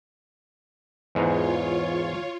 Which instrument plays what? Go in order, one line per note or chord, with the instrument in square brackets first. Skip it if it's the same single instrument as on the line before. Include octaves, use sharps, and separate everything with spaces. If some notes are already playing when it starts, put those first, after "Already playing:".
[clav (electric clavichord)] E2 G#2 [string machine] F4 C#5